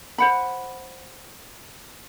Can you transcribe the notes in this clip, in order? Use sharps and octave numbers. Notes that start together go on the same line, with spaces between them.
C5 F#5 B5